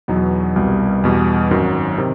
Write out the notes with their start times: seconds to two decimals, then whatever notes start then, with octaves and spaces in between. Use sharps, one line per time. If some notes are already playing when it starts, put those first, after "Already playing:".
0.08 E2 B2 F#3 B3 D#4
0.56 C2 B2 G3
1.04 E2 B2 G3
1.51 G#1 F#2 D#3 F#3
1.98 C3 D#3